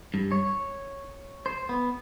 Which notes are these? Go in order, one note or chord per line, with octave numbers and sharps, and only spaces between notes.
G2
C#5
C5
B3